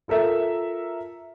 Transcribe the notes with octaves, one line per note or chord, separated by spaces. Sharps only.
F4 A4 A#4 E5